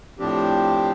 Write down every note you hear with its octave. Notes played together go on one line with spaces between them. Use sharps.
A2 F3 C4 D4 G4